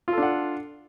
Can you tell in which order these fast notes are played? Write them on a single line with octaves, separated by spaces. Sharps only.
F4 A4 D4 F#5